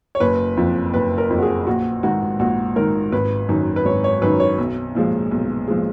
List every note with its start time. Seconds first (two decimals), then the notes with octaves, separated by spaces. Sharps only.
0.15 C#5
0.20 F#1 B4
0.57 F2 F3
0.94 F#1 B4
1.18 A#4
1.30 F2 F3
1.38 F#4
1.42 G#4
1.67 A#1 F#4
2.03 G#2 D#3 F#4
2.39 A#1 F#4
2.76 G#2 D#3 A#4
3.12 G#1 B4
3.49 F#2 D#3
3.76 B4
3.85 G#1 C#5
4.04 C#5
4.22 F#2 D#3 B4
4.40 C#5
4.58 B1
4.95 A#2 F3 G#3
5.31 B1
5.68 A#2 F3 G#3